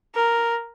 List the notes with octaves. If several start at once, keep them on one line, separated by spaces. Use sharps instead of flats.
A#4